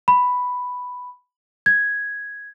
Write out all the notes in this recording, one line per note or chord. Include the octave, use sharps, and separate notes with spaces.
B5
G#6